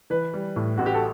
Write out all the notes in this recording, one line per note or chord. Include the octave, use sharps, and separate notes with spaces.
E3 B4
G3
A2
A1 F#4
G4
A4